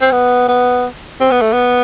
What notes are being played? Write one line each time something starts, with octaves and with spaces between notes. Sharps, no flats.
C4
B3
B3
C4
B3
A3
B3